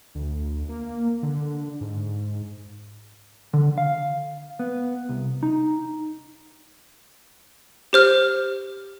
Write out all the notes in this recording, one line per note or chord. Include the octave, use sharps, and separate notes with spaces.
D2
A#3
D3
G#2
D3
F5
B3
C2
D#4
G4 C5 F6